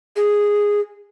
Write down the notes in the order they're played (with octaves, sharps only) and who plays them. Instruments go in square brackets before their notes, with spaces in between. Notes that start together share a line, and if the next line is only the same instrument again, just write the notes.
[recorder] G#4